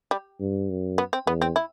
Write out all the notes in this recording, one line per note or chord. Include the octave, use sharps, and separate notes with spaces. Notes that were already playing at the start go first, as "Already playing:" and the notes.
G3
G2
F#2
B3
C4
E2 B3
C4
E4